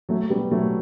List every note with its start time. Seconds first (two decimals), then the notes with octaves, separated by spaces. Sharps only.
0.09 F#3 A3
0.30 G3 B3
0.51 F#3 A3